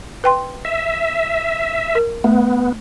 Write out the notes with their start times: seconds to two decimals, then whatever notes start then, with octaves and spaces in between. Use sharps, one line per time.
0.24 B4 G5 C6
0.65 E5
1.95 A#4
2.24 A3 B3